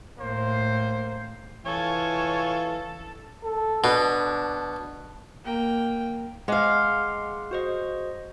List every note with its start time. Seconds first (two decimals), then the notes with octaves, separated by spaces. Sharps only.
0.19 A2 A#3 C5
1.66 E3 F4 A4 C#5 G#5
3.44 A4
3.84 B2 D4
5.44 A#3 G5
6.48 G#3 F5 F#5 C6 D6
7.51 F#4 C5 D#5